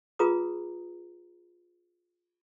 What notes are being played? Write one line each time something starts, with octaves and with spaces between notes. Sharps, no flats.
F4 G#4 B4 A#5 D#6